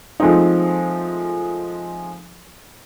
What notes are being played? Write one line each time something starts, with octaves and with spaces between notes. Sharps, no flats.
F3 G#3 A3 C4 D#4